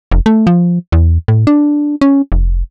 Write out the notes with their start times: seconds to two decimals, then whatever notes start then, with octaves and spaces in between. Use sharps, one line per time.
0.11 F1
0.26 A3
0.47 F3
0.92 E2
1.28 A2
1.47 D4
2.01 C#4
2.32 F1